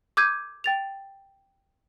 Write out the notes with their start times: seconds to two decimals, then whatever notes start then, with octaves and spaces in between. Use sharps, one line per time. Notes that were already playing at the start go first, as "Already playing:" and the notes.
0.17 D6 E6 G6 G#6 D#7
0.64 G5 A6 F7